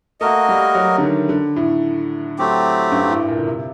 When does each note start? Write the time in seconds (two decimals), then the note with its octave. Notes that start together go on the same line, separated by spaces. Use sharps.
0.20 A3 A#3 F#4 A#4 D#5
0.49 G3
0.75 F#3
0.98 D3
1.02 D#3
1.29 D3
1.56 A2
2.38 F#3 A3 C4 G4
2.92 G2
3.11 A2
3.28 A#2
3.38 D3
3.47 C3